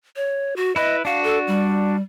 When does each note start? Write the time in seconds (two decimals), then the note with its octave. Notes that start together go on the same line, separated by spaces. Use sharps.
0.16 C#5
0.56 F#4
0.76 E4 B4 D#5
1.05 D4 F#4 F5
1.24 A4
1.47 G3